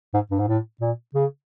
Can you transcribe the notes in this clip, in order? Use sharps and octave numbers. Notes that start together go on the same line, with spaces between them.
G#2
G2
G#2
A2
A#2
C#3